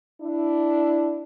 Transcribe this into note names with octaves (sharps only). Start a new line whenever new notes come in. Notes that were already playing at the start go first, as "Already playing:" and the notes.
D4 E4